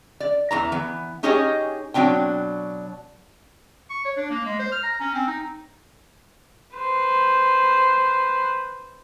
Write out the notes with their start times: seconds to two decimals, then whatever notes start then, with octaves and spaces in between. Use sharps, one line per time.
0.20 D5
0.51 E2 E3 A#5
0.72 E3 B3
1.23 C#4 D#4 G4 G#4 C#5 D#5
1.94 B2 F#3 C4 D4 G5
3.90 C#6
4.05 C#5
4.17 D4
4.30 A#3
4.46 G#3
4.59 C5
4.72 F6
4.83 A#5
5.01 C#4
5.14 C4
5.27 D#4
6.76 B4 C5